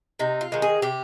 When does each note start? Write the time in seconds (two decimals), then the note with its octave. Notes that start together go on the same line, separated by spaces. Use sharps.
0.19 C3 D#4
0.41 F4
0.52 D#3 G#3
0.62 G#4
0.82 C3 G4